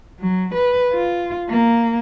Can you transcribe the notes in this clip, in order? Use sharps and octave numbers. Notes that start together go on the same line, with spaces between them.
F#3
B4
F4
A#3